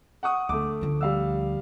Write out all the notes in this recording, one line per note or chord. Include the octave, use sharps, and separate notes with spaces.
F#5 C#6 D#6
D2 A3 D6
D2 F3
G3 F5 E6